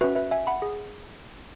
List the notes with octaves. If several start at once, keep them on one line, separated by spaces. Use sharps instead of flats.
C#4 F#4 B4 E5
B4 E5
E5 G#5
F#5 B5
G#4